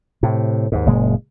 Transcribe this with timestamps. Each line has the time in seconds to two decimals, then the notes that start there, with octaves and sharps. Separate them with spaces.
0.23 A2 C3
0.72 D#2 G#2
0.86 F#1 A#2 G#3